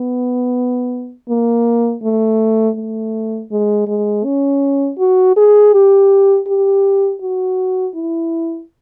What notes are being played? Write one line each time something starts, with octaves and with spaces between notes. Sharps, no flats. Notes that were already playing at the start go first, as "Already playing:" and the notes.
Already playing: B3
A#3
A3
A3
G#3
G#3
C#4
F#4
G#4
G4
G4
F#4
E4